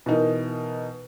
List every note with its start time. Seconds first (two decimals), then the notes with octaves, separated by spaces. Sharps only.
0.06 B2 E3 D#4 A#4